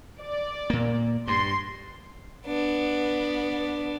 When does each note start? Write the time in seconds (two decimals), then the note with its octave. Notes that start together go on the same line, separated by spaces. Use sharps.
0.19 D5
0.70 A#2 A#3
1.27 G2 C6
2.47 B3 D4